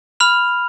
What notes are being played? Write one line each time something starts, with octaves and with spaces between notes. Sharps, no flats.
B5 F6 F7